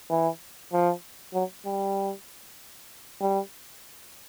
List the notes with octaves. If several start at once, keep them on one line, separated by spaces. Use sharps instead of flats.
E3
F3
F#3
G3
G3